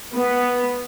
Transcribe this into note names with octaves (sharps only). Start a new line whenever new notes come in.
B3